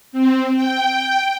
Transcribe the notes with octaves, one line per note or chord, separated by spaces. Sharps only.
C4
G5